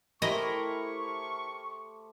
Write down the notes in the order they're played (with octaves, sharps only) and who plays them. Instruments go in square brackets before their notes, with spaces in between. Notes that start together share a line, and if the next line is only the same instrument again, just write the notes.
[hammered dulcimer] A3 G4 C5 [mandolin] E4 A#4 [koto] D#5 [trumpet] C#6